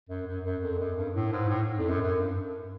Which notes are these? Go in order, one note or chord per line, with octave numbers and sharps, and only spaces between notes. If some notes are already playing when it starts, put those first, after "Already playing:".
F#2
F#2
F#2
F2
F#2
G2
A2
G#2
A2
F2
F#2
F#2
G2